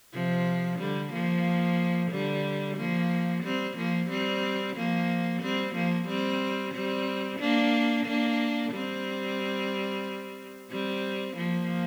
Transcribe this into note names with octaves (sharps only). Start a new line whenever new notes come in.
C3 F3
D3 G3
F3 A#3
D3 G3
F3 A#3
G3 C4
F3 A#3
G3 C4
F3 A#3
G3 C4
F3 A#3
G3 C4
G3 C4
A#3 D4
A#3 D4
G3 C4
G3 C4
F3 A#3